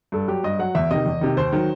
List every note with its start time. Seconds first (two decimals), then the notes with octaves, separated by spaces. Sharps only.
0.12 G2 A4
0.28 F#3 G4
0.44 G2 D#5
0.59 F#3 F#5
0.75 E2 E5
0.90 C3 D#3 D#5
1.06 E2
1.21 C3 D#3
1.37 D#2 C5
1.52 D#3 F#3